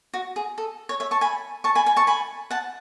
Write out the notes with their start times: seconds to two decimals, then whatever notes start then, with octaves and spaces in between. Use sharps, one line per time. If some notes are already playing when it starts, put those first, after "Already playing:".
0.14 F#4
0.36 G#4
0.58 A4
0.89 C#5
1.00 C#5 E5
1.11 A5 C#6
1.21 G#5 B5
1.64 A5 C#6
1.75 G#5 B5
1.86 G#5 B5
1.96 A5 C#6
2.07 G#5 B5
2.51 F#5 A5